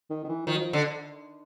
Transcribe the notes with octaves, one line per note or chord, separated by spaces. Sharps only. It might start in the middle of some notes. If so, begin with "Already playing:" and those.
D#3
D#3
E3
D#3 F3
F#3
F3
D3